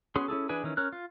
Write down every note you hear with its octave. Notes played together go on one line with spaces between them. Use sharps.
B3 C#4 F#4 G#4 C6
C#4 E4 G#4 A4
E3 D4 G#4 B4 G#5
D#3 E3 C#4
C#4 A#4 F#6
F4